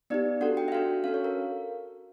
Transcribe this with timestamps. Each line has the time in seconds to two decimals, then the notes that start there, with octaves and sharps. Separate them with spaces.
0.10 B3 D#4 G4 D5
0.41 D4 F#4 A4 F#5
0.57 G5
0.68 E5
0.72 D4 F#4 A4 F5
1.04 C#4 F#4 A4 F5
1.14 C#5
1.24 A#4